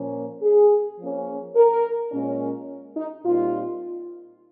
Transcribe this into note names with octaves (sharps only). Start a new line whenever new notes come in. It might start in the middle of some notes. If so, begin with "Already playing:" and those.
Already playing: A#2 F3 A#3 C#4
G#4
F3 A#3 C#4
A#4
A#2 G#3 C#4
D#4
A#2 G3 C4 D#4 F4